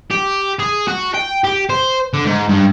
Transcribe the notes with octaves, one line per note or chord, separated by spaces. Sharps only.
G4
G#4
F#4
G5
G4
C5
D3
G#2
G2